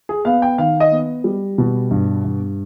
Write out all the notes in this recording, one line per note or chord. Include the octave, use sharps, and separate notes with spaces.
G#4
B3 F5
G5
D#3 F5
D#5
B3
G3
B2
G2
G2